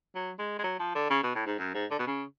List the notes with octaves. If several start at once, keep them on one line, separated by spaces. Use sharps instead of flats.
F#3
G#3
G#3
F#3
F3
D3
C#3
B2
A2
G#2
F#2
G#2
D3
B2
C#3